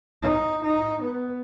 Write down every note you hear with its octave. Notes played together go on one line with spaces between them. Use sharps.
D#4
D#4
B3